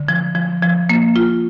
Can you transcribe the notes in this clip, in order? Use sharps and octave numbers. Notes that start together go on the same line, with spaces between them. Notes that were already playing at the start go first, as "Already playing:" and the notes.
Already playing: D3
F3
F3
F3
A#3
F4